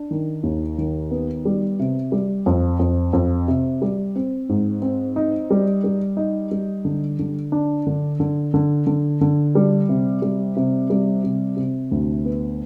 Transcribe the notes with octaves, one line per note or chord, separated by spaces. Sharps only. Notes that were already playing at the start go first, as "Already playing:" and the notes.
Already playing: D4
D#3
D#2
D#3
B3
G3
C3
G3
F2
F2
F2
C3
G3
C4
G#2
C4
D#4
G3
G3
D#4
G3
D3
D3
D4
D3
D3
D3
D3
D3
G3
C3
G3
C3
G3
C3
C3
D2
B3